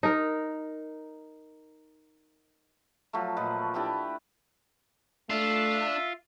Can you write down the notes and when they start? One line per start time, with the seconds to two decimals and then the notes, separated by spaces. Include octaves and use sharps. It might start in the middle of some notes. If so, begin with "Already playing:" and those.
0.03 D#4 A#4
3.13 F3 F#3 A3
3.36 A#2 A3 B4 D#5
3.74 D4 E4 G4 B4
5.30 A3 D4 F4 E5